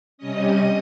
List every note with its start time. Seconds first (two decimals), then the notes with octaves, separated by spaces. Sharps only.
0.18 C3 G3 C#4 D#5 D#6
0.47 D#5 D#6